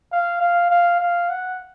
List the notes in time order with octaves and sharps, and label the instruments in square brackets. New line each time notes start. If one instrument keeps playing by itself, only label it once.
[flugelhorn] F5
F5
F5
F5
F#5